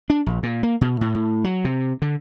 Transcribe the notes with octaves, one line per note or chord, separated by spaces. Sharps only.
D4
A#1
A#2
A#3
B2
A2
A2
F#3
C3
D3